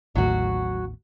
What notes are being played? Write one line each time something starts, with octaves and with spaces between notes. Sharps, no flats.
A1 D#2 A2 F#3 F#4